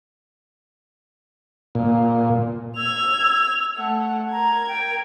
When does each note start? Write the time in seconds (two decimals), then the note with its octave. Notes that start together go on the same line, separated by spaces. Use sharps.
1.75 A#2
2.77 E6 G#6 F7
3.77 A3 F#5
4.31 A#4 A#5 G#6
4.68 G5